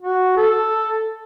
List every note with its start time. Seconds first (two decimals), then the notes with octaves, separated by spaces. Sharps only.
0.02 F#4
0.37 A4